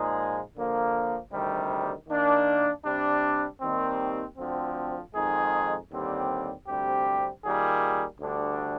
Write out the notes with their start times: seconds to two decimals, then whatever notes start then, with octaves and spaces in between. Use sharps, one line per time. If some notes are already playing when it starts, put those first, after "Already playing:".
Already playing: A#2 F3 G#3 D#4 G#4
0.56 D3 F3 A#3
1.32 D2 C3 D#3 G3
2.08 D#3 A#3 D4
2.85 C3 G3 D4
3.61 D#2 D#3 G3 C4
4.37 D2 D3 F3 C4
5.14 F2 D#3 G#3 D#4 G#4
5.91 D#2 D3 G3 C4
6.67 D2 C3 G3 C4 G4
7.44 D#3 G3 A#3 F4 G#4
8.21 D2 D3 G3 D4